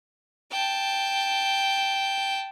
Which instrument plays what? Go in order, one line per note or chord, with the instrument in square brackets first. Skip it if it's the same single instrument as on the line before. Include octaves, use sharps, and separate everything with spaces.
[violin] G5 A5